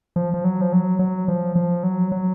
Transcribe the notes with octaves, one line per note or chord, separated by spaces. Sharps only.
F3
F3
F#3
F3
F#3
F#3
F3
F3
F#3
F#3